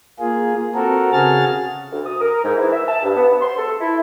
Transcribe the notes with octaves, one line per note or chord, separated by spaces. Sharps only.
A#3 F4 G#4
C4 F#4 A4 A#4
C#3 F#4 G#4 F6 A6
D2
D#6
A#4
G#2
E3
E5
A5
G2
B3
C6
A4
E4